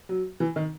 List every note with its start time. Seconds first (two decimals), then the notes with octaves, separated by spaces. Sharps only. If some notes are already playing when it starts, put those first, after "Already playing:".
0.09 F#3
0.40 E3
0.56 D#3